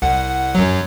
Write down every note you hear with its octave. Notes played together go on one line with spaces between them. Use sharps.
C2 F#5
F#2 F#3